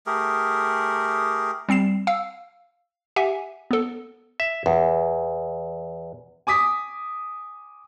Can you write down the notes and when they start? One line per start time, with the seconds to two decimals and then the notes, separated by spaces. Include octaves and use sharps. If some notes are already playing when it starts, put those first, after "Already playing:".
0.07 A3 G4 G#4 A#4
1.69 G3 C4 C7 E7
2.07 F5 E6
3.16 G4 E5 F#5 G#5
3.71 B3 A4
4.40 E5
4.66 E2
6.47 G#5 D6 D#6 B6